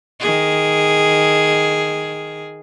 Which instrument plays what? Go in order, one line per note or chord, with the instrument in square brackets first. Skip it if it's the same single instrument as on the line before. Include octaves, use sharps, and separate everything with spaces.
[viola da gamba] D#3 G#4